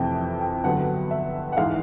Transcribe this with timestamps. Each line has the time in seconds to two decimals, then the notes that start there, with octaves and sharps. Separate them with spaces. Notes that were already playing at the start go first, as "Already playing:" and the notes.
Already playing: F2 C3 E3 A3 C4 G5
0.41 G5
0.64 G2 D3 F#3 B3 F#5
1.11 E5
1.52 F#5
1.57 G#2 E3 G#3 F5